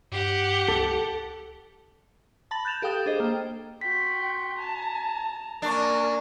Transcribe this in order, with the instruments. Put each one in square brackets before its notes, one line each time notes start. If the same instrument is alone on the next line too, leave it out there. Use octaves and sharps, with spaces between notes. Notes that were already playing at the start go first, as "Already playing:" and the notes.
[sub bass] G2 [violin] G4 F#5
[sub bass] C#2 [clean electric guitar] A4
[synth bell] A5 B5 A6 A#6 F#7
F#6 G6 A6 E7 F7
G4 A4 F5 G5 D#6
D4 G#4 A4 C5 D#5
A#3 G5
[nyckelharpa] F#4 C6 [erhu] G5 [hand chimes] B6
[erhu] A5 [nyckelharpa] A#5
[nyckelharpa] A#3 G#5 [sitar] D4 [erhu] A#4 [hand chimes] D5 C#6